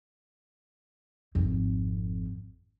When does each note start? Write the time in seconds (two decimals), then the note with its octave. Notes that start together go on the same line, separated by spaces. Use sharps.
1.35 G#1 F2